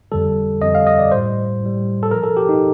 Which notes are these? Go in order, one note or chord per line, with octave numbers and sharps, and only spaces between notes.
F2 D3 G3 A4
F2 D3 G3 D#5
F5
D#5
D5
A2 G3 C5
A2 G3
A4
A#2 F3 A#4
A4
G4
D#4